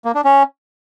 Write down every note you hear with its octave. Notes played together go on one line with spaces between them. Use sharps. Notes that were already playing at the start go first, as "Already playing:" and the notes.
A#3
D4
C#4